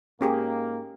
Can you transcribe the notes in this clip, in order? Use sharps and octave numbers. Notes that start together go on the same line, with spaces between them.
G#2 A#3 C#4 G4 G#4